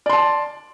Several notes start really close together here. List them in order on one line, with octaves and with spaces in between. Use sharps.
D5 C6 A5